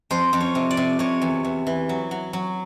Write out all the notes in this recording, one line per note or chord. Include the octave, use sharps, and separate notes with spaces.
F2 C5
F2
C#5
C3
D5
C3
C3 C#5
E2
E2
E3
F#3
F#3
F#3